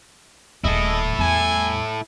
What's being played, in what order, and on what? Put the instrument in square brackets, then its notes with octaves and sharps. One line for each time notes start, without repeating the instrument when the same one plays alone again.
[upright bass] D#1 D#3 [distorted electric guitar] E4 A4 [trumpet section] G#4 D#5
[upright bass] E2 G3 [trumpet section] G#5